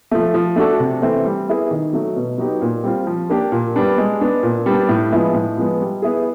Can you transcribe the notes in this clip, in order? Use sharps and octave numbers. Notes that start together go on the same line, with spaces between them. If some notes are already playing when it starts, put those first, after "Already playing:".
F3 A3
F3
A3 D4 F#4 A4
C3
E3 A3 C4
G3
B3 E4 G#4
D#3
F#3 A3
B2
F#3 B3 D#4 G4
A#2
G3 C4 F4
F3
A#3 D4 G4
A#2
G3 B3 D4
G#3
B3 D4
A#2
G3 B3 D4
A2
F3 G#3 B3 E4
A2
F3 G#3 B3
G3
B3 E4 G#4